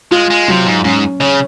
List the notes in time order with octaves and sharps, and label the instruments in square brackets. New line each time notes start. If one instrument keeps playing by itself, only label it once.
[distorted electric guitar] G#3 [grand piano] F4
[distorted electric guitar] G#3
[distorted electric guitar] C3 [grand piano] F#3
[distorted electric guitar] G#2
[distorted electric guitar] G#2 [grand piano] C#4
[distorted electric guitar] C#3 [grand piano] C#5